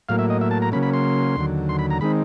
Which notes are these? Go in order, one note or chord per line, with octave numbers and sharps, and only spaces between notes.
A2 F#3 A#3 F5
E5
D#5
E5
A5
A#5
C#3 F#3 A#3 C#4 B5
B5
C6
D#2 D3 F#3
C6
B5
A#5
D#3 G#3 C4 D#4 B5